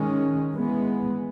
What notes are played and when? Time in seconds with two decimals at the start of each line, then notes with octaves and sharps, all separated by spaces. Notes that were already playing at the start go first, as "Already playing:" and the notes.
Already playing: D#3 G#3 C#4
0.53 E3 G#3 B3